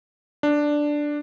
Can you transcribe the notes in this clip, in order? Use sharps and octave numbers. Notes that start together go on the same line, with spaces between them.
D4